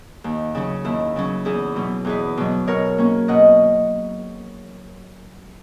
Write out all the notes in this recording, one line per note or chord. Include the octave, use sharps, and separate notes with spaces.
D#2
C#3 F#3 C#4
D#2 E4
C#3 F#3 C#4
E2 E4 G#4
B2 F#3
E2 G#4 B4
B2 F#3
B2 A#4 C#5
A#3 C#4
B2 D#5 F#5